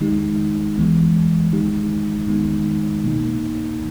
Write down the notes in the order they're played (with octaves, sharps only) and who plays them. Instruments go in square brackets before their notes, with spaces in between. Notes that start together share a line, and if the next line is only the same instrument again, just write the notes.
[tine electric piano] D#3 G#3 D#4 G4
E3 G#3 B3
D#3 G#3 D#4 G4
D#3 G#3 B3 D#4
B2 A#3 D#4